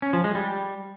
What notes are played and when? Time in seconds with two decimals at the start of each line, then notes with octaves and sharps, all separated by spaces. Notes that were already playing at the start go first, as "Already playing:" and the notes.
0.02 C#4
0.13 F3
0.24 G#3
0.35 G3